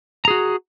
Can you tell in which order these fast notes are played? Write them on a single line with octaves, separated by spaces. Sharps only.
A#5 G#4 F#4